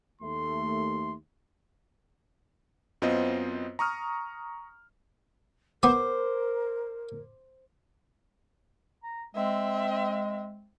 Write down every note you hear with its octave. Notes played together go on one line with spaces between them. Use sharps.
D#2 A3 C6
F#2 B3 C4 F4 C5 D#5
A#5 C#6 D#6 F6
B3 A#4 C5 D6 D#6
A#5
G#3 C4 E5